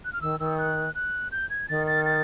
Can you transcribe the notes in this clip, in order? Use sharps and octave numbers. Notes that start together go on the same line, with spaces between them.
F#6
F6
D#3 E6
D#3 E6
F#6
F#6
G6
G#6
D#3 A6
A6
A6